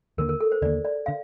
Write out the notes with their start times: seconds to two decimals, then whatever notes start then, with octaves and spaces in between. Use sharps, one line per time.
0.18 D#2 D3 G3 A#3 A#4
0.29 A#4
0.41 A4
0.52 C5
0.62 D#2 D3 G3 A#3 D5
0.85 D5
1.06 D3 F5